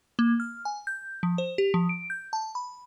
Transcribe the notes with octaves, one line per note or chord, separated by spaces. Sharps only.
A#3
F6
G#5
G6
F3
C5
G4
F3
D7
G6
A5
B5